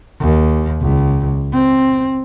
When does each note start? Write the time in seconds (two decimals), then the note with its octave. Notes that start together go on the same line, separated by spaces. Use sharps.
0.20 D#2
0.81 C#2
1.54 C4